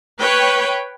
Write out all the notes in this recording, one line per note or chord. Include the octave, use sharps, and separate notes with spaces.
B4 C#5 G5